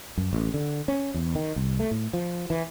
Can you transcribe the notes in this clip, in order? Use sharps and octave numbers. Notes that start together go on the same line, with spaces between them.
F#2
A1
D3
C#4
E2
D#3
C2
A3
A2
F3
E3